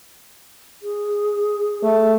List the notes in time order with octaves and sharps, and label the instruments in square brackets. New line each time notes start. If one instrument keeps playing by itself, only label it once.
[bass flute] G#4
[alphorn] A3